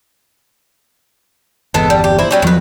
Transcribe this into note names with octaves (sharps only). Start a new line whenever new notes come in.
G1 E2 G#3 B3 A4
G3
G4
A#2 C4 E4
F#3 G3 C#4
E2 D#3 F3 F#3 B4